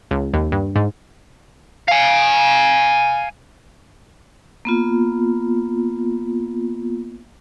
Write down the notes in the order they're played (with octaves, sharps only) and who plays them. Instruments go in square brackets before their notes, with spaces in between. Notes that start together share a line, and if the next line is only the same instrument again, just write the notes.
[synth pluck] C#2
D#2
G2
G#2
[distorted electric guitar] F5 G#5
[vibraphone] A#3 B3 F4